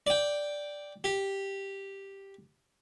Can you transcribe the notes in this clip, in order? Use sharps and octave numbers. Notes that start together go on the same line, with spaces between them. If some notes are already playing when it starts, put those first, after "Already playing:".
D5 G5
G4